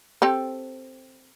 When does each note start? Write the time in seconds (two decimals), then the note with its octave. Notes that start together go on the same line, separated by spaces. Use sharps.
0.22 C4 G4 A4